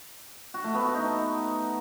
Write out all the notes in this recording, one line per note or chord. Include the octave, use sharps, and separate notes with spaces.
F#4
A3
B3
F#4
D#4